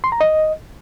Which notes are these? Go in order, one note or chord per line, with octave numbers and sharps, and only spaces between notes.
C6
A#5
D#5